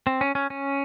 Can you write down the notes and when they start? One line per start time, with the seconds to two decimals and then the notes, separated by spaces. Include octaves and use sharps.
0.07 C4
0.21 C#4
0.35 C#4
0.50 C#4